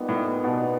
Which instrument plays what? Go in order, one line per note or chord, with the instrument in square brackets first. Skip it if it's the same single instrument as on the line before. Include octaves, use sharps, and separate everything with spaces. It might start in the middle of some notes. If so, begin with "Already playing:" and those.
Already playing: [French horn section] A#2 G3 B3 D#4
[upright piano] A2
B2